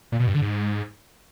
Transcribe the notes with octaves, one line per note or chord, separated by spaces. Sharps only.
A#2
B2
G2
D3
G#2